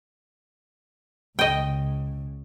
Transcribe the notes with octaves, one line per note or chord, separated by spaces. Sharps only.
C#2 C#3 D#5 G5